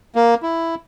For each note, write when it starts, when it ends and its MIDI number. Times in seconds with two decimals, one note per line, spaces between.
0.15 0.35 58
0.43 0.75 64